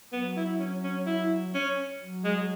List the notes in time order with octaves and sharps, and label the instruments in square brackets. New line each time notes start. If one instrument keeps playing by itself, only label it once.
[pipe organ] F#3 [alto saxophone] B3
[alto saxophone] E4
C#4
C#4
E4
C#4
[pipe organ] F#3
[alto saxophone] G#3